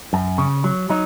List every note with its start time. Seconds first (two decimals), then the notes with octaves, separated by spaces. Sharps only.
0.13 F#2
0.38 C#3
0.64 F#3
0.90 F#3 D#4